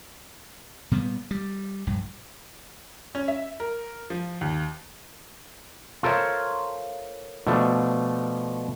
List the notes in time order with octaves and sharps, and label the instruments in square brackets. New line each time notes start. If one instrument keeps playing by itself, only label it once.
[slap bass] A#2 G3 B3
G3
A#1 G2
[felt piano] C#4
E5
A#4
F3
D#2
[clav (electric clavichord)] F4 A4 A#4 C5 C#5 E5
B2 F3 A3 D4